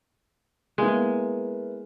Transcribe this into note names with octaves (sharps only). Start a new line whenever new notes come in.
G#3 A#3 B3 E4